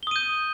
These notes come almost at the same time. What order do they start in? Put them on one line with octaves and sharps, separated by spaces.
G7 D#6 D#7 G6